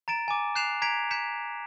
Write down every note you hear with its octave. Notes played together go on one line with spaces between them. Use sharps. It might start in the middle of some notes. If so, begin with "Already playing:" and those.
A#5 A6 D7 E7
G#5 D6
F#6 G6 C7 E7 F7
A#5 G#6 B6 D7 F7
G6 B6 C#7 E7